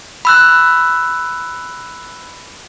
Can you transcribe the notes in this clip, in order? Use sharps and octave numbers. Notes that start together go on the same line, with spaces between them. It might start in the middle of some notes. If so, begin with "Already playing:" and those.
B5 E6 F#6